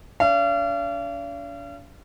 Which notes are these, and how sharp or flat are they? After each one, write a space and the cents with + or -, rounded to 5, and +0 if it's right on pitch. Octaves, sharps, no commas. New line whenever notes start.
D4 -45 F5 -40